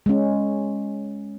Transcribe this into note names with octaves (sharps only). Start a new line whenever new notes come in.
G#3 C#4